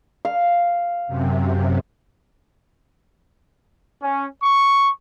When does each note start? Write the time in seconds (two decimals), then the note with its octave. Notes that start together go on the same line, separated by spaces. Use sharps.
0.25 F5
1.07 F#2 C3
4.02 C#4
4.42 C#6